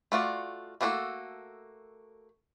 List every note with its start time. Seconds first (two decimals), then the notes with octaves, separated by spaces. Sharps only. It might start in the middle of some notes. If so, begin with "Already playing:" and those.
0.12 A3 F4 F#4 D5
0.81 A3 A#3 D4 F#4 A4